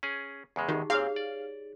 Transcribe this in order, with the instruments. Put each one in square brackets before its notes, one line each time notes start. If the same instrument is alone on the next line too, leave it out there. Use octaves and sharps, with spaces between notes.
[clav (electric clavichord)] C#4 G#4
E2 C#3 G#3
[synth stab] D#3 [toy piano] D#4 G4 G#4
[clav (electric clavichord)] A#2 C4 [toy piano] G#4 C#5 [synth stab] F5
[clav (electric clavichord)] D5